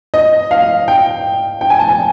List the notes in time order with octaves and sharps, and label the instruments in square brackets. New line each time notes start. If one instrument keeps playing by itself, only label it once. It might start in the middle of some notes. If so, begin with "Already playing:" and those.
[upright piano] D#5
F5
G5
G5
G#5
A5
G#5